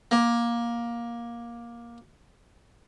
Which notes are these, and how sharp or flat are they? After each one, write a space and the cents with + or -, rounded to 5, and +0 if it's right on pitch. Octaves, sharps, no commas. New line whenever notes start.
A#3 +15